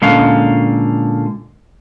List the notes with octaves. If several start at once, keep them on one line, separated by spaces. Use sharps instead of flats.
A#2 D3 G#3 C#4 F5